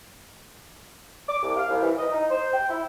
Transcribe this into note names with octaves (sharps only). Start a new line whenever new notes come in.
D6
C2
F5
C2
E3
D#5
D#4
C5
G5
E4